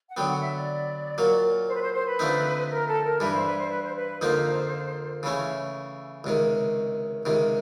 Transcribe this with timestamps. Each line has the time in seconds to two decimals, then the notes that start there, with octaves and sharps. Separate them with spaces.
0.09 F#5
0.17 D3 F#3 B3 G5
0.29 F#5
0.42 E5
0.55 D5
1.18 A#2 F#3 A#3
1.68 C5
1.76 B4
1.81 C5
1.94 C5
2.06 B4
2.19 D3 F3 A3 C4 D#4
2.70 A#4
2.87 A4
3.04 A#4
3.20 G2 E3 G3 B4
3.33 C5
3.46 B4
3.58 C5
3.71 B4
3.83 C5
3.96 B4
4.21 F2 D3 F3 A#3 D#4 C5
5.23 C#3 E3 A3 C#4
6.24 C#2 C3 D#3
7.26 C#2 C3 D#3